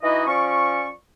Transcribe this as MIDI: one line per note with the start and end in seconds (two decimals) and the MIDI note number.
0.03 0.26 52
0.03 0.26 63
0.03 0.26 64
0.03 0.26 66
0.03 0.26 75
0.27 0.90 53
0.27 0.90 61
0.27 0.90 74
0.27 0.90 85